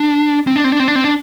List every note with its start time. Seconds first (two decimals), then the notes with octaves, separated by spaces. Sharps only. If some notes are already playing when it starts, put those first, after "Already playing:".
Already playing: D4
0.47 C4
0.56 D4
0.64 C4
0.72 D4
0.80 C4
0.88 D4
0.96 C4
1.04 D4